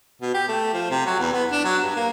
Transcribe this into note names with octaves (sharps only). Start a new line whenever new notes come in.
B2
G4
A3
F3
C3
F#3
E2
B3
D4
F#3
G2
A#3